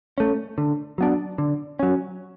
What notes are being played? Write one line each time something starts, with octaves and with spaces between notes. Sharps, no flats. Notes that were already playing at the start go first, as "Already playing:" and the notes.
A3 C#4
D3
F#3 B3 D4
D3
F#3 C#4